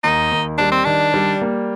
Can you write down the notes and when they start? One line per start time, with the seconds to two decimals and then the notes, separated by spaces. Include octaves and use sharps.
0.04 D#2 D#4
0.32 D#2
0.58 G3 D4
0.72 C4
0.85 D#3 D4
1.14 G3
1.41 A#3